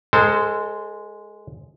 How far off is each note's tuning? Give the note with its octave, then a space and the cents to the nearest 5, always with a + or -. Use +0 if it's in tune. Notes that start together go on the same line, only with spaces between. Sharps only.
G#3 +0 A4 +30 C5 -20